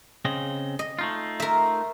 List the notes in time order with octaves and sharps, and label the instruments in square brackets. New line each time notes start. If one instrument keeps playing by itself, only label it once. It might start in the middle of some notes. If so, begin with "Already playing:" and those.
[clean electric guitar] C#3 C4 D#5
[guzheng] D#5
[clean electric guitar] A3 D#4 F4
[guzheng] A#4 E5